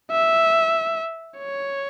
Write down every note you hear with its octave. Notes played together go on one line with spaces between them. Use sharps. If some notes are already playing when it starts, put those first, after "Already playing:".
E5
C#5